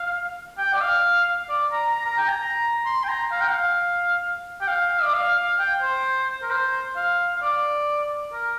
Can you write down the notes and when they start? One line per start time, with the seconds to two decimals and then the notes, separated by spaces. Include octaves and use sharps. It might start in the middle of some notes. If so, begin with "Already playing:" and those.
Already playing: F5
0.58 G5
0.73 D5
0.81 F5
1.49 D5
1.72 A#5
1.95 A#5
2.06 A#5
2.18 G5
2.29 A#5
2.86 C6
3.04 G5
3.08 A#5
3.32 F5
3.41 G5
3.50 F5
4.61 G5
4.68 F5
5.03 D5
5.14 F5
5.37 F5
5.59 G5
5.82 C5
6.42 A#4
6.51 C5
6.96 F5
7.36 F5
7.42 D5
8.33 A#4